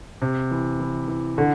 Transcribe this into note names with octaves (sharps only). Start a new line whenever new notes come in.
C3
E3
E3
E3
D3